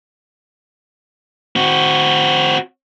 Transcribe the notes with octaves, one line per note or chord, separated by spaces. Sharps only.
C4 F#4